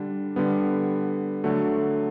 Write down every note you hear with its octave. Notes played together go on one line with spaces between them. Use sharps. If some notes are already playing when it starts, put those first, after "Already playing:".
Already playing: D3 G3 D4
D3 G3 B3
D3 F#3 A3